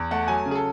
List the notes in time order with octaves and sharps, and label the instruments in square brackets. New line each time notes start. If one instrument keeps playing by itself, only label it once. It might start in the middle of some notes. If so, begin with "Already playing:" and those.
Already playing: [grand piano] E2
A3 F#5
F#3 G#5
C#3
G#4
A4